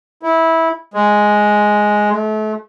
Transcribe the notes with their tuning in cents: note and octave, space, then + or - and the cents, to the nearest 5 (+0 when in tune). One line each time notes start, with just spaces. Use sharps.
E4 -15
G#3 +5
A3 -35